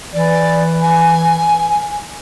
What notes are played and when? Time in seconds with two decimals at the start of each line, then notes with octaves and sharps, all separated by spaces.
0.13 E3 D5
0.81 G#5